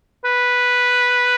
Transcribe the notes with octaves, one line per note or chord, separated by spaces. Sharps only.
B4